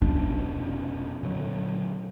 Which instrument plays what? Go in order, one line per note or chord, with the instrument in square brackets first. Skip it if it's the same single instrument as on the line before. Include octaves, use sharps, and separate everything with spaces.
[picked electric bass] F1 B2 D4 [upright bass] C#4
[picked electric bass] A#2 D3 F#3